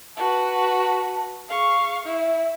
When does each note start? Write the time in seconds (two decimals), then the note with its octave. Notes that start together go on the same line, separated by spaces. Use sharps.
0.17 F#4 B4 A5
1.49 G#4 F5 C#6
2.06 E4 E5